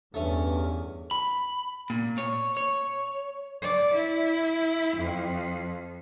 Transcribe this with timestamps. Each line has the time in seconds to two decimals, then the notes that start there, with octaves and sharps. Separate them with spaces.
0.14 E2 G2 A3 C#4
1.11 B5
1.90 A#2
2.18 C#5
2.57 C#5
3.61 D5
3.94 E4
4.97 F2